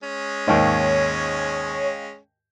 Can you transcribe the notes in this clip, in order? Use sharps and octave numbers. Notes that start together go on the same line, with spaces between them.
G#3 C#4
D#2 G#2 C#5 D#5 F5 G5